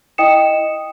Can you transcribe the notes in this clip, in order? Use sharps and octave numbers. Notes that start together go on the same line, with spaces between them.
E4 D#5 G5 D#6 C#7 E7